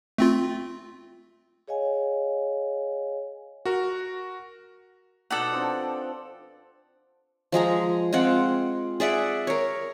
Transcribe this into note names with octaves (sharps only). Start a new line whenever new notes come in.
A3 C4 F4
G#4 C#5 D#5 F5 G#5
F#4 A#4
B2 D#4 A4 D5 F#5 A#5
F3 C4 D4
F3 G#3 G#4 A#5
G#3 C4 F4 F#5
G#4 D5 E5 F#5
A#4 C#5